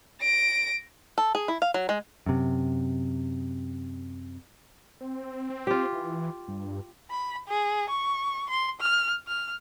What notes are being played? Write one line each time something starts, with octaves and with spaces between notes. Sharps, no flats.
A#6 D7
A4
G#4
E4
F5
F#3
G#3
F#2 C3
C4
C4
F4 G4
E3
G2
B5
G#4
C#6
C6
F6
F6